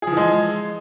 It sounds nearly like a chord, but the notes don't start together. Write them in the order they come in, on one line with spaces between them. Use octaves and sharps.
G#4 F3 E3 G#3